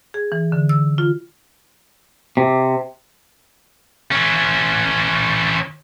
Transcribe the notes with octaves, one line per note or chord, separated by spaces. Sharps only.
G#4
E3
D3
E6
F4
C3
E3 C#4